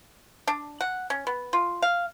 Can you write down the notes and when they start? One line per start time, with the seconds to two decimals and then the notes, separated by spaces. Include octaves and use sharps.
0.47 D4
0.81 F#5
1.10 C#4
1.27 B3
1.53 F4
1.82 F5